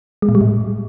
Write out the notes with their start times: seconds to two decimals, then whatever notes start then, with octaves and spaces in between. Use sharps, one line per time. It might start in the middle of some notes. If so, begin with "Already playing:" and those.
0.22 G#3
0.29 A#2
0.35 G3
0.41 A2